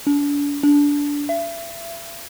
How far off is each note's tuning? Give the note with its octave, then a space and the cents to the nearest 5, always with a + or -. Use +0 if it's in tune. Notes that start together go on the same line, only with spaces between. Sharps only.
D4 -40
D4 -20
E5 +35